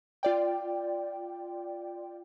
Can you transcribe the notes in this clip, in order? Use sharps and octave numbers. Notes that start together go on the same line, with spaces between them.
F4 D5 G5